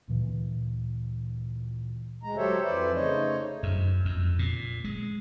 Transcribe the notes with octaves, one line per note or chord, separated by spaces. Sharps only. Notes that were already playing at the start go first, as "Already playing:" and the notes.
D2 A#2 E3
D2 G#3 A#5
F#3 G4 A4 C5 C#5 E5
F2 E3 B4 C5 D5 E5
C#3 A3 D#4 C5 C#5 D#5
F#2
F2
A#2
G#3